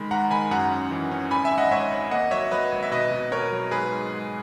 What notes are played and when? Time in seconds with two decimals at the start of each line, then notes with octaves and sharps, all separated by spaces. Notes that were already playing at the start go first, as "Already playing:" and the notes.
Already playing: D#3 G#3 B5
0.11 G#2 F#5 A#5
0.31 D#3 G#5 B5
0.51 F#2 F#5 A#5
0.71 C#4
0.91 E3
1.11 C#4
1.31 G#1 G#5 B5
1.44 E5 G#5
1.51 G#2
1.58 D#5 F#5
1.71 G#2 C#5 E5
1.91 G#1
2.11 A#3 D#5 F#5
2.31 F#3 C#5 E5
2.51 F#3 B4 D#5
2.72 G#1
2.83 E5
2.91 B2 B4 D#5
3.11 B2
3.32 B2 A#4 C#5
3.52 F#3
3.71 G#2 G#4 B4
3.92 G#2
4.12 G#3